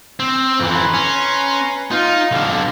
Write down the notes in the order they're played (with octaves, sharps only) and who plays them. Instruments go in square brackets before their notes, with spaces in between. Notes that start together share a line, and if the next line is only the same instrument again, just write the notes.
[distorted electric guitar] C4
[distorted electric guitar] F2 E3 [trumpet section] B4 A#5 C6
[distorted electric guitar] C#4
[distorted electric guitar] D#4 [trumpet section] F4
[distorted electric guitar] B1 D3 [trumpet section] G3 C4 F5